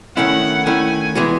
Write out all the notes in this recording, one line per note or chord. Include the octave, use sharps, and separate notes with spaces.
D#3 A3 C#4 E4 F#5
D#3 A3 C#4 E4 G#5
E3 G#3 B3 F#4